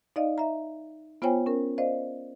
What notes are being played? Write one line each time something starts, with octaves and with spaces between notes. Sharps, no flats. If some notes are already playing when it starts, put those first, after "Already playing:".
D#4 D5 D#5 F5
E5 A#5
B3 F4 C5 C#5 G5 G#5
C#4 A#4
C5 D5 D#5 F5